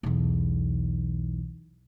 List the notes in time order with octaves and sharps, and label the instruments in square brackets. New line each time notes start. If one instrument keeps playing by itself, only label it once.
[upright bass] B1 E2